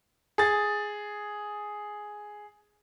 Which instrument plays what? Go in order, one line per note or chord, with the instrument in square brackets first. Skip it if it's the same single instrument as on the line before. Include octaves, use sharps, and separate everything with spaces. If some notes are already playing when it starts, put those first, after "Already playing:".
[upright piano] G#4 A6